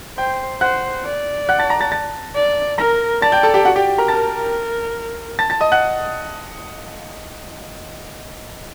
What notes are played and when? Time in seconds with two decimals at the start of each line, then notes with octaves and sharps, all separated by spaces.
0.18 C5 G5 G6
0.61 C5 F#5 F#6
1.05 D5
1.49 F#5 F#6
1.59 A5 A6
1.70 A#5 A#6
1.80 A5 A6
1.92 A5 A6
2.35 D5
2.78 A#4 A#5 A#6
3.22 D5 A5 A6
3.32 G5 G6
3.43 A4 A5
3.54 G4 G5
3.65 F#4 F#5
3.76 G4 G5
3.98 A#4 A#5
4.08 A#4 A5 A6
5.39 A5 A6
5.50 A5 A6
5.61 D#5 D#6
5.72 F#5 F#6